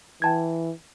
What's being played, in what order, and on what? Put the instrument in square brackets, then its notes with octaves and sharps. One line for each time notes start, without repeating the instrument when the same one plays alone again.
[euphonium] E3 [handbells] G5 A5 G#6